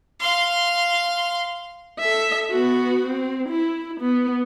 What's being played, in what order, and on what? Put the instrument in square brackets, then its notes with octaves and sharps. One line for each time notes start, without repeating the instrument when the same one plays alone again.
[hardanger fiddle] F5 C6
[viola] A4 E5
B3 F#4
C4
E4
B3